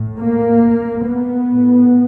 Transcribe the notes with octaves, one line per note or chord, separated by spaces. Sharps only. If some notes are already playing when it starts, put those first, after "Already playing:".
Already playing: A2
A#3
B3
A2